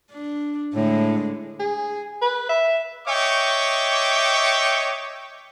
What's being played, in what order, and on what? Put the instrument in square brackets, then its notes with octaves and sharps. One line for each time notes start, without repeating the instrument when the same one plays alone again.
[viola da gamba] D4
[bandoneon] A2 [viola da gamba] D3 G#3 A3
[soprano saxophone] G#4
B4
E5
[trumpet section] C#5 D#5 E5 G5 C#6 D6